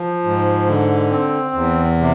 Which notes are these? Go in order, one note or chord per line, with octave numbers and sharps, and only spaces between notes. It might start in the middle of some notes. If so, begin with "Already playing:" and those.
Already playing: F3
G#2
D3
C4
E2
C3